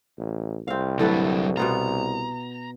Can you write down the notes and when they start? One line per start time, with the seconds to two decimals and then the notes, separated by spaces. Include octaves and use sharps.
0.18 A1
0.68 C2 C4 F5
0.99 A2 D3 F#3 A4 B4
1.57 B2 B3 F4 A#5